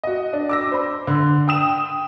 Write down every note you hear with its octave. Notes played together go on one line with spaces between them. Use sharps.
F#4 D#5
D4
D6 E6 A#6
C5 B5
D3
G5 D#6 E7